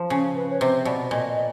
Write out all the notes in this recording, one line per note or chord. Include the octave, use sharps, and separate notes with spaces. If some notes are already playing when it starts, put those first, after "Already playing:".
Already playing: F3
C#3
B4
C#5
C3 C5
B2 D5
A#2 D#5
D#5